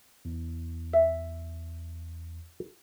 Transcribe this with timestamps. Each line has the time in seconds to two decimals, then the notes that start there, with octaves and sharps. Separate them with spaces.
0.25 E2
0.93 E5